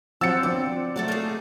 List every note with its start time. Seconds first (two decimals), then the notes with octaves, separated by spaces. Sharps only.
0.21 F3 F#3 C4 F#5 G5 E6 A6 C#7
0.43 F3 B3 D4 D5
0.96 F#3 A3 A4 D5 F#5
1.08 A#3 D#4 G#4